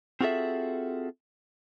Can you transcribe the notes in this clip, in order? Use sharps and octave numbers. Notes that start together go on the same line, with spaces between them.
C4 F4 F#4 G#4 A4 E5